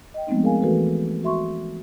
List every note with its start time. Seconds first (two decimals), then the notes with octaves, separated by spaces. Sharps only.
0.14 D#5 G5
0.27 F3 G#3 A3 B3 C4 D#4
0.43 G#4 A#4 F5 G#5
0.62 E3 A3 F#4 A4 B4
1.23 F#4 E5 C6 C#6